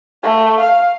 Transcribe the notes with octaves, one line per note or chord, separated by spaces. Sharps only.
A3
F5